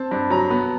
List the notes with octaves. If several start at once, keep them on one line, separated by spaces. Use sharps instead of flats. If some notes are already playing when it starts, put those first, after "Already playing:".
Already playing: C4 A5
G2
F#3 A#5
B3